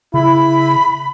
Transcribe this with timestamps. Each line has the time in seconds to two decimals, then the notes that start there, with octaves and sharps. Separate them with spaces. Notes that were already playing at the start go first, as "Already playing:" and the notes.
0.14 C#3 E4 B5